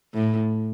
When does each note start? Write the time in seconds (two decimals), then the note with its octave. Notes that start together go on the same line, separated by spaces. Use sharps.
0.14 A2